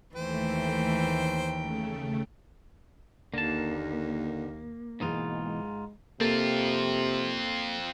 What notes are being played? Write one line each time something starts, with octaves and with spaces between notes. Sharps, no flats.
D#2 E3 A3 C5 G5
C#3 A3
D#2 D3 A#3 A5
G#2 B2 E3 D#4 F4 G#4
G#3
C3 A#3 C4 F4 A4 A6